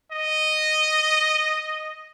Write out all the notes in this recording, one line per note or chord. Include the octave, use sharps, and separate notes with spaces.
D#5